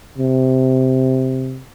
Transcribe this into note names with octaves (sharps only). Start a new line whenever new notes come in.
C3